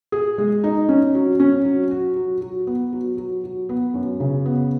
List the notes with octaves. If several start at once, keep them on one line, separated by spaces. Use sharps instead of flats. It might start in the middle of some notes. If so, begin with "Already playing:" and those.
G#4
G#3
D#4
C#4
F#3
C#4
F#3
F#4
F#3
F#3
B3
F#3
F#3
F#3
B3
F#2
C#3
B3